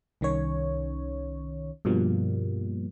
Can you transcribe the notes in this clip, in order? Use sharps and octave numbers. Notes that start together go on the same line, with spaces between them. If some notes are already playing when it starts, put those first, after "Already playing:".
C2 D#3 C#4 C#5
G2 B2 F3 G3 A#3